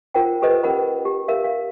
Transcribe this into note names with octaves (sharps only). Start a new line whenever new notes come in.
F4 A#4 C5 F#5 G5
G4 A4 B4 C5 D#5
C#4 A#4 F#5 B5
G4
A#4 E5 F5
F5